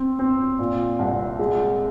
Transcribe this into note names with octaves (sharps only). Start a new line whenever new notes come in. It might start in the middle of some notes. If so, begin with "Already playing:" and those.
Already playing: C4
C4
A#2
C2
G#3